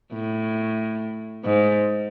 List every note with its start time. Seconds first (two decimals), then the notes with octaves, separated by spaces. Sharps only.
0.13 A2
1.45 G#2